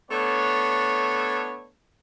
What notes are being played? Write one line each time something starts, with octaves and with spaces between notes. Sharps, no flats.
A3 B3 D4 C#5